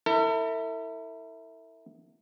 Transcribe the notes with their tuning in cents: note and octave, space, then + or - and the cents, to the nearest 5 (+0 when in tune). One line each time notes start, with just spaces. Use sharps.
E4 -15 A4 +45